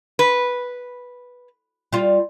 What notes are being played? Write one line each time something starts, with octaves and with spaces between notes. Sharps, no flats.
B4
G3 F4